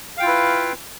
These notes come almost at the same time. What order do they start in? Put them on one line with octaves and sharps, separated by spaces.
F5 G5 F4 E4 B4